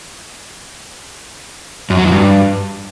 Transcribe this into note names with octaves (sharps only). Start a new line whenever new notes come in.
F#2
F#3
E2
G2